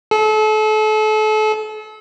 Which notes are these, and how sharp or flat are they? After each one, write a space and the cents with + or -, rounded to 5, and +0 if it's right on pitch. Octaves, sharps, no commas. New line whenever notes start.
A4 -35